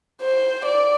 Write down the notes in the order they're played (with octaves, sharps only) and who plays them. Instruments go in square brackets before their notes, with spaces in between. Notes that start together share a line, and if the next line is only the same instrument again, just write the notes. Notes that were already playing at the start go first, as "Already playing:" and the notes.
[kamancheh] C5
D5